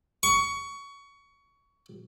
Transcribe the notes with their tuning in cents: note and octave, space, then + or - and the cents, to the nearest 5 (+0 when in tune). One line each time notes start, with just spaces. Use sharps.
C#6 +20